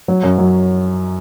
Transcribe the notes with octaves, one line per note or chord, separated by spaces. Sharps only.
F#3
F#2
F#3